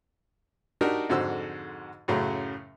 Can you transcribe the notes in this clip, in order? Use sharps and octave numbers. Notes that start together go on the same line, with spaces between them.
D4 D#4 F#4 G4 A#4
F2 G#2 D3 F#4 C5 E6
F#2 A2 C#3 F#3